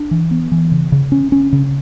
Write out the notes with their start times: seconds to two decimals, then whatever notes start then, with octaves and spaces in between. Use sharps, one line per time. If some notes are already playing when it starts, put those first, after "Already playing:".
Already playing: D4
0.11 E3
0.31 B3
0.52 E3
0.72 C#3
0.92 C#3
1.12 C#4
1.32 C#4
1.53 C#3